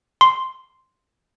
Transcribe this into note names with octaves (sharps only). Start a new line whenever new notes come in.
C6